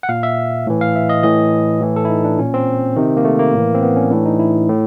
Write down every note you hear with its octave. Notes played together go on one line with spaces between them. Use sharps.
F#5
A#2 F5
E5
A2 E3
F5
E5
D#5
A2 E3 D#5
A2 E3
A4
E4
D#4
D4
A#2 C#4
C4
C3 D#3
A#3
A3
A#3
A2 E3
C4
B3
C#4
A2 E3 D4
D#4
E4
A2